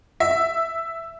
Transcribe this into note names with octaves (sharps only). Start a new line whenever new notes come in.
E5